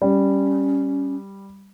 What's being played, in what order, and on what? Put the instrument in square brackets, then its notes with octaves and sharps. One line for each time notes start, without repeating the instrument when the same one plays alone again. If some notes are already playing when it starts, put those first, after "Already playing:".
[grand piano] G3 [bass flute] C#4